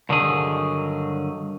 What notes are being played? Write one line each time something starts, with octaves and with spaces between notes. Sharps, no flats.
G2 D3 D#3 F#3 G#4